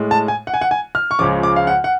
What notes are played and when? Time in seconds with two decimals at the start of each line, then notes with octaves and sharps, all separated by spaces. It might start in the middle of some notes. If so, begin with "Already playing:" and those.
Already playing: A2 G#3
0.11 A5
0.28 G#5
0.47 F#5
0.54 G#5
0.61 F#5
0.71 G#5
0.95 F6
1.11 C#6
1.19 C#2 C#3 F3 D6
1.43 D6
1.56 F5
1.67 F#5
1.84 F#5